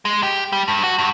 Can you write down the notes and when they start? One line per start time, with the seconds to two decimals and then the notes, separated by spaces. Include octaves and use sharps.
0.05 G#3
0.23 G4
0.52 G3
0.68 G2
0.84 F#4
0.98 G2